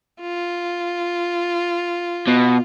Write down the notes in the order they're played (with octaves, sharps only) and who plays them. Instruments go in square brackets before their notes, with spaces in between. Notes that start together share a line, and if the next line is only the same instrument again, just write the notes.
[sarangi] F4
[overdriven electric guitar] B2